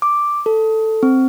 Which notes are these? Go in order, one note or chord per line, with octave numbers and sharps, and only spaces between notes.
D6
A4
C4